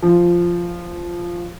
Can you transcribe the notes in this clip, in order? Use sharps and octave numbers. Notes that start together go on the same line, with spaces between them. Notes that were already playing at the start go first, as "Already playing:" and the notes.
F3